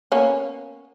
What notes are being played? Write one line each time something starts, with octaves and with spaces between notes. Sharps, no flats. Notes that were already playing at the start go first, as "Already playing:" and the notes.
A#3 B3 C#4